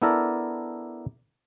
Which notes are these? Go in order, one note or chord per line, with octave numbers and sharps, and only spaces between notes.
B3 D4 E4 A4 A#4 D5